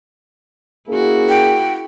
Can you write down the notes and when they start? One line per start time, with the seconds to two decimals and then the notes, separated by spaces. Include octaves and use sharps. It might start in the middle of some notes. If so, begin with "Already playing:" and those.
0.89 A#3 C#4 E4 F#4 G#4
1.29 G5